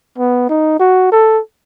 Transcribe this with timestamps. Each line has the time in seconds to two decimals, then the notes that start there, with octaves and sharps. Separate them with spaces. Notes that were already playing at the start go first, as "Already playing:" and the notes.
0.18 B3
0.49 D#4
0.79 F#4
1.12 A4